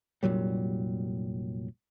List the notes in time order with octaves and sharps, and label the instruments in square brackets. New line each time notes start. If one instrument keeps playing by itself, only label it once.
[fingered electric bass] F1 A#2 F#3 G3